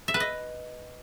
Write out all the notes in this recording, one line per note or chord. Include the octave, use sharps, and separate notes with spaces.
E5
B4
D#5